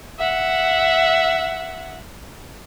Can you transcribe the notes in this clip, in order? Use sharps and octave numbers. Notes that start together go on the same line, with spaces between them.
E5 F#5